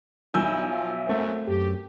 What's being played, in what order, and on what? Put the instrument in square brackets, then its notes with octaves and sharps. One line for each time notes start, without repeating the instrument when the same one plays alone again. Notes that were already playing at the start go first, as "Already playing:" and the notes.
[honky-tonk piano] B1 E6 G6 [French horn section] G2 D#4 E4 [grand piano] G#5
[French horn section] F3 F#3 F4 [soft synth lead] E5
[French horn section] F#2 [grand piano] A3 C4
[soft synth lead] F#2 [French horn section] G4